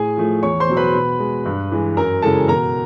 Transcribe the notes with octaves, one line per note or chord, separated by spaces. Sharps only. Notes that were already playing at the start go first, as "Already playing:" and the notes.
Already playing: A2 G#4 G#5
F3 A3
E2 C#5 C#6
C5 C6
B2 F#3
B4 B5
B2
G#3
G2
E3 G#3
F#2 A#4 A#5
C#3 E3 G#3 A4 A5
B2 A#4 A#5